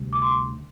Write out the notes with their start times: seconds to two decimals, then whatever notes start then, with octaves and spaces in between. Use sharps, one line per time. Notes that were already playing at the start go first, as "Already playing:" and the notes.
Already playing: D2 C3 G3
0.13 D6
0.22 C6